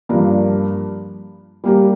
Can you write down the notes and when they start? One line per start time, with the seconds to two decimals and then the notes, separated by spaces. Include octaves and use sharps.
0.09 G2 F3 A#3 D4
1.64 G3 A#3 G4 A#4